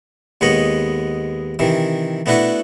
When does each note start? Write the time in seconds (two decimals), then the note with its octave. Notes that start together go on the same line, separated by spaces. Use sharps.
0.41 D#2 G#3 B3 C#5 D#5 B5
1.59 C3 D#3 E3
2.26 A3 B3 D4 E4 F#4 B4